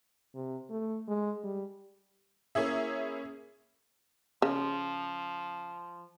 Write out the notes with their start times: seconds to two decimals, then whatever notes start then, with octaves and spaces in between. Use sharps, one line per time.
0.35 C3
0.70 A3
1.08 G#3
1.44 G3
2.55 A#3 C#4 E4 G#4 E5
4.42 C#3 F3